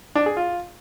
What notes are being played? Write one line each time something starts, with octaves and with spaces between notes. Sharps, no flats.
D4
G#4
F4